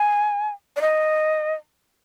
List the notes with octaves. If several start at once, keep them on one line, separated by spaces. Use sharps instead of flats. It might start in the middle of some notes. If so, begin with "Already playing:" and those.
Already playing: G#5
D5
D#5